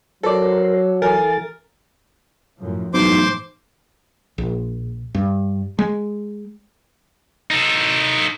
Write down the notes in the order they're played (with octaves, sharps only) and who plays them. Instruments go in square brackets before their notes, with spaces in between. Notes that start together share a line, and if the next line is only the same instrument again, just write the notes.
[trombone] F#3 [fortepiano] A4 D5 [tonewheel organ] A#4 C5
[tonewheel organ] E3 A4 A6 [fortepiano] A#4 [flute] G#5
[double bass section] F#2 A2 F3
[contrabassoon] B1 [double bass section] G#2 E3 A3 [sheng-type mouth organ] C5 C6 D6
[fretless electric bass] A#1
G2
G#3
[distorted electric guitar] D#4 A4